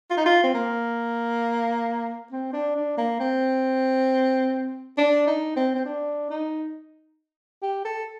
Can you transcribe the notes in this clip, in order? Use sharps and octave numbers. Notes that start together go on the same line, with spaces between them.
F4
D#4
F4
C4
A#3
C4
D4
D4
A#3
C4
D4
D#4
C4
C4
D4
D#4
G4
A4